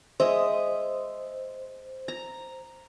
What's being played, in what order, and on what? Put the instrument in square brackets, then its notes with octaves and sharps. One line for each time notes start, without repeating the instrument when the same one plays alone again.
[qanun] G#3 D#5 E5 [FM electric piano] C5
[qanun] A#5